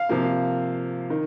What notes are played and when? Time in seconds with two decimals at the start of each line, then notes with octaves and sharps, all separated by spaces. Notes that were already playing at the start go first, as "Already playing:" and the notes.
Already playing: F5
0.09 C3 F3 A#3
1.10 D#3